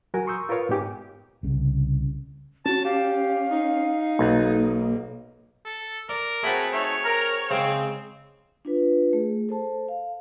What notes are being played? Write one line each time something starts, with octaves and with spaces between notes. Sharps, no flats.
F#3 F#4 A#4 G#5
A#5 C6 C#6 D#6 E6 G6
F4 A#4 B4 C#5 F5
G#2 B3 D#4 G4 G#5 D6
C2 C#3
C#4 F#4 A5
G4 F5
D#4
B1 A#3
A4
A#4 D5
A3 C4 F#4 G#4 C#5 B5
A3 D#4 C#5
A#4
C#3 G#3 C4
D4 F4 B4
A3 G#4
A4 C5 A5
F5